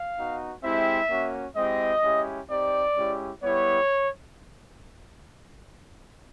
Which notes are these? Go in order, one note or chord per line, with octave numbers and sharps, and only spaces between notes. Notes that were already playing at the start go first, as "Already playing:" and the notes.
Already playing: F5
B3 D#4 F#4
G#3 C4 E4 G4 E5
A#3 C#4 F#4
G#3 C4 E4 G4 D#5
G#3 C#4 E4 G4
C4 D#4 G4 D5
G#3 C#4 E4 G4
G3 B3 E4 G4 C#5